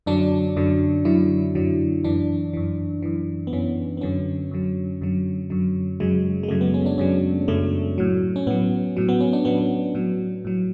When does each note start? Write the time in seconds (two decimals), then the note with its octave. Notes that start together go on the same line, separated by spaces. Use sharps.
0.06 F#2 D3 F#3 D4
0.56 F#2 D3 F#3
1.05 F#2 D3 F#3 E4
1.55 F#2 D3 F#3
2.04 F#2 E3 D4
2.53 F#2 E3
3.02 F#2 E3
3.47 B3
3.53 F#2 E3 C#4
3.97 B3
4.01 F#2 D3 F#3 C#4
4.51 F#2 D3 F#3
5.01 F#2 D3 F#3
5.50 F#2 D3 F#3
6.00 F#2 C#3 F#3 G#3
6.43 G#3
6.48 F#2 C#3 F#3 A3
6.61 B3
6.74 C#4
6.86 D4
6.98 F#2 C#3 F#3 C#4
7.48 F#2 C#3 F#3 A3
7.98 A2 F#3
8.36 C#4
8.47 A2 F#3 B3
8.97 A2 F#3
9.09 B3
9.21 C#4
9.33 D4
9.45 A2 F#3 B3
9.95 A2 F#3
10.45 A2 F#3